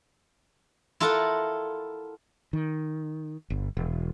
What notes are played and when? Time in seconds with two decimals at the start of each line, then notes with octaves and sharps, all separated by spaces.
1.00 E4 F4 A4 A#4 F#5
2.53 D#3
3.50 G1
3.77 E1